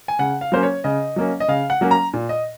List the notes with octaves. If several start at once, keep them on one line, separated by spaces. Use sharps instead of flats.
G#5
C#3 F#5
F5
F#3 A#3 C#4 C5
C#5
C#3 D#5
F#3 A#3 C#4
D#5
C#3 F5
F#5
F#3 A#3 C#4
A#5
A#2
D#5